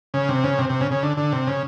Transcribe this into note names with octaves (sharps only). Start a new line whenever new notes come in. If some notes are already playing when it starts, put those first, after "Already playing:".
C#3
C3
C#3
C3
C3
C#3
C#3
D3
D3
C3
C#3